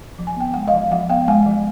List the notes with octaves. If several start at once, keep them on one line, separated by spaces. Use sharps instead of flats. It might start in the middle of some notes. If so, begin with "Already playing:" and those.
F3
G#5
B3 G5
G#3 F#5
D#5 F5
F3
F3 E5 F#5
B3 F5 G5
G#3 F#5 G#5
F3